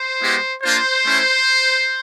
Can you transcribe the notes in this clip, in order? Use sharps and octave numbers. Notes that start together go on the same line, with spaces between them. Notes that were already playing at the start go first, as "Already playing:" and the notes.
Already playing: C5
G#3 B3 E4 G4
A#3 D4 F4 C5
A3 C#4 E4